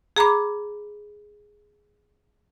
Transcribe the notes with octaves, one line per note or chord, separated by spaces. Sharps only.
G#4 A#5 B5 D6